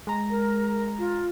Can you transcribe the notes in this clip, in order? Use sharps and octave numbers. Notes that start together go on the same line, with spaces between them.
G#3 A#5
A#4
F4